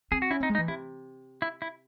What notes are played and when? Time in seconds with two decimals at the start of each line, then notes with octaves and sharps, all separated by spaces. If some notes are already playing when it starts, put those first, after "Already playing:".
0.12 C4 G#4
0.22 F#4
0.31 C#4 E4
0.40 C4 D#4
0.50 G#3
0.55 D#4
0.58 E3
0.68 C3 E4
1.42 E4
1.62 E4